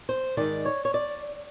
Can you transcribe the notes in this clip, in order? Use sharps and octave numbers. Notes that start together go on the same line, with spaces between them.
C5
G#2 D#3 D5
C#5
C#5
D5